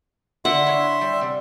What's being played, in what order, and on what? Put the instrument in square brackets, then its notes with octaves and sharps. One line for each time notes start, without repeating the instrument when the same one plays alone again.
[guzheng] D3 [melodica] E5 C6 [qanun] F#5
[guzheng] E4 C#5 F5
G3
C3 G3